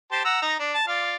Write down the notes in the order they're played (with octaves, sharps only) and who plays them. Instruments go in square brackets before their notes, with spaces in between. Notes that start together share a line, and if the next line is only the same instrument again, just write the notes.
[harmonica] G4 C5 A5
F#5 A#5 E6
D#4 A#5
D4
A5
F4 D5 F5